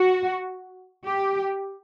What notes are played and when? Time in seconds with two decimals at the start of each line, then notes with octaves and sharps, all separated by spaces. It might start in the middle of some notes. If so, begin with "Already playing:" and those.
Already playing: F#4
1.05 G4